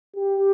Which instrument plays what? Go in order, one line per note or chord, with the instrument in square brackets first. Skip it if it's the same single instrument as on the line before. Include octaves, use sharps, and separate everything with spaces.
[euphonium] G4